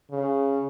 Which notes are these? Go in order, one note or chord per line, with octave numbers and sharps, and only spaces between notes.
C#3